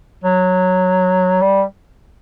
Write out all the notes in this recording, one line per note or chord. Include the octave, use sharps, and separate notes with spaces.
F#3
G3